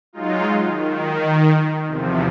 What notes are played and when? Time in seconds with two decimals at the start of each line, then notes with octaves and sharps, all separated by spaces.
0.13 F#3 G#3 D#4 F4
0.65 D#3
1.87 E2 C3 F3